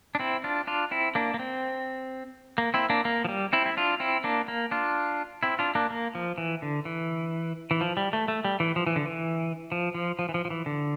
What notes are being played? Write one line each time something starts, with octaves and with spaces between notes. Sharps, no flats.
D4
C4 E4
D4 F4
D4 F4
C4 E4
A#3 D4
A#3
C4
A#3
C4 E4
A#3 D4
A#3
F3
G3
C4 E4
E4
D4 F4
C4 E4
A#3 D4
A#3
D4 F4
C4 E4
D4 F4
A#3 D4
A#3
F3
E3
D3
E3
E3
F3
G3
A3
A3
G3
E3
F3
E3
D3
E3
F3
F3
F3
E3
F3
F3
E3
D3